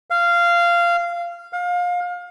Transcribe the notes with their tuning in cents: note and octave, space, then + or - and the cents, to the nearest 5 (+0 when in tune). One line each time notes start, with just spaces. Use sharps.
F5 -15
F5 +30